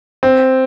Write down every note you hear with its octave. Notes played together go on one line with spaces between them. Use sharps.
C4